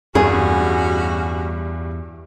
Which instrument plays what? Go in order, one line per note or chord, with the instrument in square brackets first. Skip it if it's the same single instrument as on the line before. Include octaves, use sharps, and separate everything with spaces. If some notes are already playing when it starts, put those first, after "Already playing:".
[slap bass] E2 [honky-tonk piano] G2 [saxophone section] C#4 F#4 [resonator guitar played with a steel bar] G#4